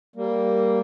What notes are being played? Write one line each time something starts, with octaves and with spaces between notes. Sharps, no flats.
G3 A#3